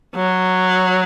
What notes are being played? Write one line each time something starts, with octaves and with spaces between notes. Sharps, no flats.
F#3